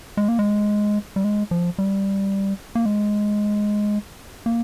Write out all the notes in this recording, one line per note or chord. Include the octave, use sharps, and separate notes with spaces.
G#3
A#3
G#3
G3
G#3
F3
G3
A#3
G#3
A#3